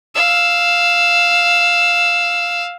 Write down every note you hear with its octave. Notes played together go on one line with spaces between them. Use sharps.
F5 E6